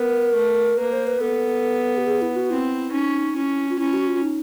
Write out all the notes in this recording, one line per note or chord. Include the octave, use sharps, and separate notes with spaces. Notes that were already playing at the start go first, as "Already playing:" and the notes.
Already playing: B3 A#4
A3
A#3 B4
C5
B4
B3 A4
G4
G#4
E4
F#4
C4 E4
C#4 D#4
C#4 E4
F4
C#4 E4
F#4
F4
D#4